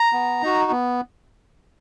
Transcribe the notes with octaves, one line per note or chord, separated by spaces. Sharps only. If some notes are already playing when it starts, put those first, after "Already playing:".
Already playing: A#5
B3
D#4 F#4
B3